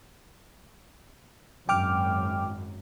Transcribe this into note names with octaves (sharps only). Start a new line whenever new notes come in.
G#1 F#2 G5 D6 F6